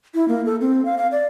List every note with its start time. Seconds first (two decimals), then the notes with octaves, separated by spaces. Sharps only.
0.15 E4
0.28 A#3
0.45 A4
0.61 C4
0.85 F5
0.98 F5
1.12 D5